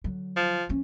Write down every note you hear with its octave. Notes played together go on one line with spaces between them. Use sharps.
D3 F#3
F3
F3 C#4